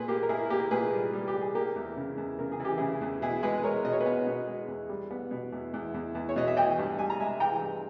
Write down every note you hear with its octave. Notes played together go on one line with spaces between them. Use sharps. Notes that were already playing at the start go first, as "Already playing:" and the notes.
Already playing: A#2 G#4 B4
A#3 G4
A#4
A#3 E4 G#4
A#3 G4 A#4
A#2 G#4 B4
G3
G3
G4
G3
G#4
A#3 G4 A#4
E2
C#3
E2
C#3 A#4
G#4
E3 G4
C#3 E4 G#4
E2
B2 E4 G#4
G#3 G#4 B4
G#3 A#4 C#5
B2 D#5
C#5
B4 D#5
B3
B2
G#3
E2
G3
B3
B2
E2
E2
E2
E2
C#5
B2 D#5
E5
E3 D#5 G5
G2
G2 G#5
A#5
G#3 E5 G#5
E3 G5 A#5
G2